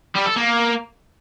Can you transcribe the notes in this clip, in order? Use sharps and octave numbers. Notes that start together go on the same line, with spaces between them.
G3
A4
A#3